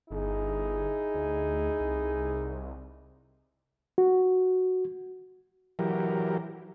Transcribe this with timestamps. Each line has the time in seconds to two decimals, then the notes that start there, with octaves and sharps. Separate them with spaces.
0.10 G1 D#4 E4 G#4
1.14 D2
1.80 C2
3.98 F#4
5.79 E3 F#3 G4 A#4